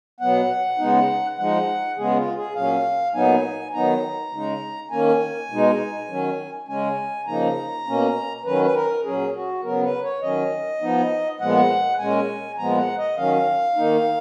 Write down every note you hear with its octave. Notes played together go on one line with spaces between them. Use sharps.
B2 F#3 B3 F#5
C#3 G#3 B3 D#4
F3 G#3 D#4 F#5
C#3 G#3 B3 G#4
F4
G#4
A#2 F#3 C#4 F5
A#2 F#3 B3 D#4 G#5
D#3 F#3 B3 D#4 A#5
C#3 G#3 D#4
D#3 A#3 C#4 G#5
B2 G#3 D#4
D#3 F#3 C#4
C#3 G#3 C#4 G#5
C#3 F3 A#3 D#4 A#5
B2 A#3 C#4
D#3 F#3 C#4 B4
B4
A#4
A#2 F#3 C#4 G#4
F#4
C#3 F#3 B3 A#4
B4
C#5
D#3 F#3 C#4 D#5
F3 B3 D#4
A#2 F3 G#3 B3 F#5
A#2 G#3 C#4 G#5
A#2 F3 G#3 B3 A#5
F#5
D#5
D#3 F#3 C#4 F5
D#3 A#3 D#4